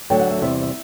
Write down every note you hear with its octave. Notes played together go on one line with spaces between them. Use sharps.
D2 D3 F#3 G5
F#5
E5
E2 C3 G3 E5
E5